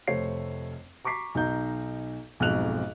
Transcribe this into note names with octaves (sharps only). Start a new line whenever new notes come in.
F1 A3 C5 C#5 C7
A#5 C#6 D6 B6 C7
B1 D#4 A#5 G6
B1 F2 G#2 F#6 F7